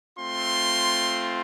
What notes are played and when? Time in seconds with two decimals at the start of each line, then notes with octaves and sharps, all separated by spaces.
0.17 A3 C4 F4 C6